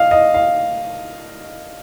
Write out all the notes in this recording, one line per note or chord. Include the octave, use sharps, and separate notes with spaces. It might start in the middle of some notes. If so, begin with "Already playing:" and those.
Already playing: D#5 F5
D#5
F5